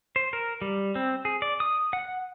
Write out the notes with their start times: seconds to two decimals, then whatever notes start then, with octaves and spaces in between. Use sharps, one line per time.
0.16 C5
0.33 A#4
0.62 G3
0.95 C4
1.25 G#4
1.42 D5
1.60 D#6
1.93 F#5